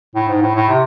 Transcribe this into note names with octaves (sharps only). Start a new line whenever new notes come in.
A2
G#2
A2
A2
C3